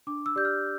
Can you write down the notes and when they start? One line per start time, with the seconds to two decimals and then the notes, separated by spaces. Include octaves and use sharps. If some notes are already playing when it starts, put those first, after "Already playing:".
0.07 D4 D6
0.26 E6
0.36 G4 D5 G6
0.45 F6